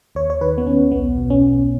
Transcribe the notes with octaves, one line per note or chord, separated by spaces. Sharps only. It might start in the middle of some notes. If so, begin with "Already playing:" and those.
D#2 C#5
C#5
D#3 B4
B3
D#2 C#4
B1 B3
B2
C#4
B2